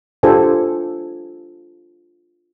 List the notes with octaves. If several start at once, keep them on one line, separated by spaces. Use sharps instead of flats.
D4 F4 G4 A4 C5 G#5